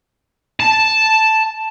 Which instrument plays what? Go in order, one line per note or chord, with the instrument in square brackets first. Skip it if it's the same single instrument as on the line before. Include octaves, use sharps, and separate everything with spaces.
[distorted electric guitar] A5